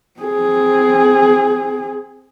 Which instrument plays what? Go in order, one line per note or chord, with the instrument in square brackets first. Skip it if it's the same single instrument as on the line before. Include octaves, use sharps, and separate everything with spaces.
[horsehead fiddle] C4 G#4